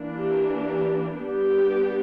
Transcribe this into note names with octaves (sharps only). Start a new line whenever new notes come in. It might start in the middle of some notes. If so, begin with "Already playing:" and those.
Already playing: E3 A#3 D4
G4
G4
G3 B3 D4 G4